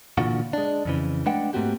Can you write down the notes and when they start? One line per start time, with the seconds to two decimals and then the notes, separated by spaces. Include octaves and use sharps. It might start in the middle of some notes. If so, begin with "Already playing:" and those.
0.18 A#2 D3 E3 F4 F#4
0.53 G#3 D4
0.85 F2 C#3 E3
1.26 G#3 A3 D4 B4 F#5 G5
1.53 G#2 A3 A#3 C4 F#4 G4